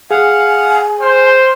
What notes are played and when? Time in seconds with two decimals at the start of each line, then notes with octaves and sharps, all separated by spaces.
0.11 G#4 F5 F#5 G#5
1.01 C5 G5 F6